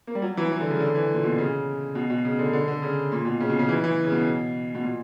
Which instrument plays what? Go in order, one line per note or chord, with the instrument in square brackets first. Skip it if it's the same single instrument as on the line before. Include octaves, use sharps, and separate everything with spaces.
[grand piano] A#3
G3
F#3
E3
E3
D3
C#3
D3
E3
A#2
B2
C#3
B2
B2
C#3
D3
D3
D3
C#3
A#2
B2
C#3
B2
C#3
E3
E3
C#3
B2
B2
A#2